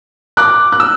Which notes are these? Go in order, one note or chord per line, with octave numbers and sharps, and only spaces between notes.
D6 F#6
F#6
E6